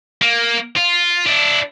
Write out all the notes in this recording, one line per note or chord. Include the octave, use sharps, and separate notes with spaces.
A#3
F4
D4 E4